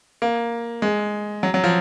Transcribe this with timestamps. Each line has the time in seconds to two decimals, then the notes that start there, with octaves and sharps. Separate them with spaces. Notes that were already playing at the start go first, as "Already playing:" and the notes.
0.22 A#3
0.82 G#3
1.43 F#3
1.54 F#3
1.64 F3